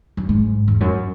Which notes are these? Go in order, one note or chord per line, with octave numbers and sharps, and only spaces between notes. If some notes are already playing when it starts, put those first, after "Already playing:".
F#2
G#2
E2
F#2